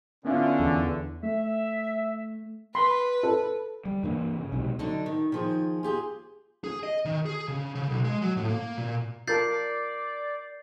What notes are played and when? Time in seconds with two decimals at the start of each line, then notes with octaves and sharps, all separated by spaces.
0.25 D3 B3 C#4 E4 F4
0.60 E2
1.23 A3 E5
2.75 B4 B5 C6
3.23 A4
3.85 G3
4.04 G2 E3 A#3
4.38 C#3
4.52 B1 C3 G#3
4.79 D3 F#3 D4 D#4
5.06 D#3
5.32 D#3 F3 G#4
5.83 F4 G4 G#4
6.64 G#4
6.83 D#5
7.05 D#3
7.26 G#4
7.48 C#3
7.75 C#3
7.90 B1
8.05 G#3
8.22 F#3
8.37 A2
8.49 A#3
8.78 A#2
9.28 F4 A#4 D5 A5 G6 A6 C7